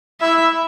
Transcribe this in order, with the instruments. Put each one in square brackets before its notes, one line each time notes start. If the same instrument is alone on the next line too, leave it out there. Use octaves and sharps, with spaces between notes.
[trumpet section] E4 [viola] E5